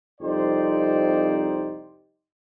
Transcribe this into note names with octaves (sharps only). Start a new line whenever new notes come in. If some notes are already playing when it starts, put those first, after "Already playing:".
C2 F2 D#4 G4 C5 D5